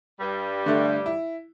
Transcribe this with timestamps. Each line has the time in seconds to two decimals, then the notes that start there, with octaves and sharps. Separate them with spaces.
0.20 G2 G3
0.66 D3 A3
1.06 E4